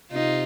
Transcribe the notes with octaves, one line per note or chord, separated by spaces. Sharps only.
C3 D#4 F4